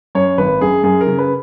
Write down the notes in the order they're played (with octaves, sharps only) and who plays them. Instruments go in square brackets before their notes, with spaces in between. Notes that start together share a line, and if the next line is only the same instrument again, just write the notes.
[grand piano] F#2 C#5
G#1 B4
F#2 G#4
F#2 G#4
A#4
C#3
B4